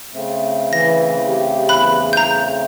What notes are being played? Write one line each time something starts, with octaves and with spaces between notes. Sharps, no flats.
C#3 A3 C4
E3 A#6
G4
E2 B5 F#6
A#5 G6